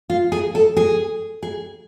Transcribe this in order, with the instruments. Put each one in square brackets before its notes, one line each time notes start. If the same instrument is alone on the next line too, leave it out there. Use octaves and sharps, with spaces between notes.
[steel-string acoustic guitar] F4
G#4
A4
G#4
G#4